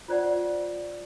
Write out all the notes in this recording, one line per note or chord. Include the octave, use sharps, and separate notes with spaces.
F4 C5 D5 F#5